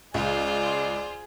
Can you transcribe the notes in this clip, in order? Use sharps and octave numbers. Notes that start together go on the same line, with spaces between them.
C#2 F4 G#4 C5 D5